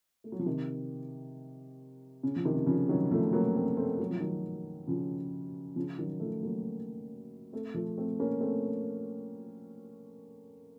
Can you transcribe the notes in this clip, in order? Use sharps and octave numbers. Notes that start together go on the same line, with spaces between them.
A3
F#3
F3
C3 D#3
C#3
F3
C3 D#3
C#3 F3
D#3 F#3
F3 A3
F#3 A#3
A3 C4
A3 C4
F#3
F3
D#3 F#3
C#3 F3
C#3 F3
D#3 F#3
F3 A3
F#3 A#3
A3 C4
F3 A3
A3 C4
A#3 C#4
A3 C4